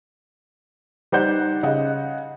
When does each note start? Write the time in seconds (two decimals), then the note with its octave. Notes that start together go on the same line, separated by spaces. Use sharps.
1.12 G3 D#4 C5 D5 F#5 G6
1.63 C#3 D#5 F#5